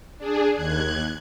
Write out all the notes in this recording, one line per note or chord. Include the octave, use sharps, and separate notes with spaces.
D4 G#4
D#2 F#6 G#6